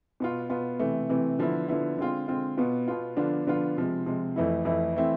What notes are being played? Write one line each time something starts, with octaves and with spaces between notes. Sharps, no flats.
B2 B3 F4
B2 B3 F4
C3 E3 A3
C3 E3 A3
D3 F3 B3 E4
D3 F3 B3 E4
D3 G#3 C4 F4
D3 G#3 C4 F4
B2 B3 F4
B2 B3 F4
D3 F3 B3 D4 F4
D3 F3 B3 D4 F4
C3 F3 G#3
C3 F3 G#3
F2 E3 A3 E4
F2 E3 A3 E4
E3 A3 C4 E4